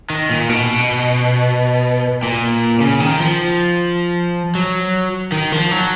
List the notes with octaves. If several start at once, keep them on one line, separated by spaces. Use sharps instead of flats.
D#3
A#2
B2
A#2
C#3
D#3
F3
F#3
D#3
F3
F#3